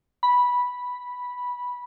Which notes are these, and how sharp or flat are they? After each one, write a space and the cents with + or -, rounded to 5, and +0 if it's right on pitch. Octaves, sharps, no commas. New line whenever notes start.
B5 -10